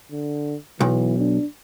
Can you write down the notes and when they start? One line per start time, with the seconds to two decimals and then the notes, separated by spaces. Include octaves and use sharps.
0.11 D3
0.81 B1 E3
1.18 D4